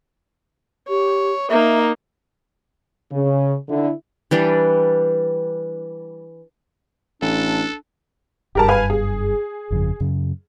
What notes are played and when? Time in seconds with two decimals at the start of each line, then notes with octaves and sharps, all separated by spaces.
0.88 G4 C#5
1.50 A#3 D#4 E5
3.11 C#3
3.68 D3 E4
4.31 E3 G3 D4
7.22 A1 D4 A4
8.55 F#1 G2 G4 A#4 A5
8.68 B4 F5 G#5
8.90 G#4
9.70 G1 F2 C#3
10.00 F#2 C#3